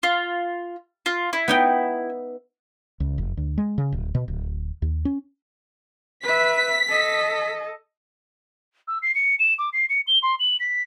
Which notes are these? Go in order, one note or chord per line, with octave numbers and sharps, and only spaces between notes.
F4
F4
E4
B3 D#4 G5
C#2
F1
D2
G#3
C#3
D1
B2
D1
D#2
C#4
B4 E5 B6
A4 D#5
E6
C7
C#7
E7
D6
C7
C#7
G7
C6
F#7
B6